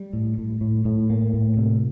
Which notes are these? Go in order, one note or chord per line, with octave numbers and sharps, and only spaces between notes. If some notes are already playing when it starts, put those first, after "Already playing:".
Already playing: G3
A2
A2
A2
A2
A#3
A2
C3